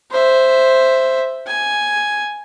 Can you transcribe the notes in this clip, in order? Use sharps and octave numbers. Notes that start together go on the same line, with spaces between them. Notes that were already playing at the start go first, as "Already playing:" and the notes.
C5 E5
G#5